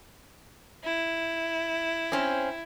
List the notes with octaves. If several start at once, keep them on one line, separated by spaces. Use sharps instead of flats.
E4
C4 C#4